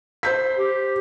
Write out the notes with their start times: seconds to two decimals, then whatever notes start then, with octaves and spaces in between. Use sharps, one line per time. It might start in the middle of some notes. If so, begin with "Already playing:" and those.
0.23 C5 G6 B6
0.58 G4